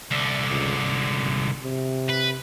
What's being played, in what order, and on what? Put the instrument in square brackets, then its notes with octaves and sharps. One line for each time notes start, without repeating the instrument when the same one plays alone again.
[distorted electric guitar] C2 D3
[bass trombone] C#2
G#1
C3
[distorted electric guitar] B4